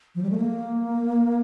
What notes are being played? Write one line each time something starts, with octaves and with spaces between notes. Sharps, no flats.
F3
G3
A3
A#3